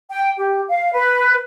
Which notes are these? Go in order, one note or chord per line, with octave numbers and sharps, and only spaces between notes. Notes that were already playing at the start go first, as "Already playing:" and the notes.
G5
G4
F5
B4